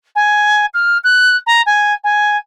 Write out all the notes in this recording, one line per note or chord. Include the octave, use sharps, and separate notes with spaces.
G#5
F6
F#6
A#5
G#5
G#5